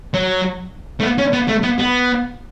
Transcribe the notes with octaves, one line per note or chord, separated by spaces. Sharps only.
F#3
A3
B3
C#4
B3
A3
B3
B3